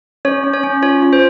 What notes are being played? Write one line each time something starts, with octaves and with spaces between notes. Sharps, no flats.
C#4 C#5
C#4
C#5
C#4
F4 C#5
F4
C5